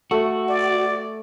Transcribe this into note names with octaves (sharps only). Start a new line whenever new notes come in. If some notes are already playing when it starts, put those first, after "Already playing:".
A3 F#4
D5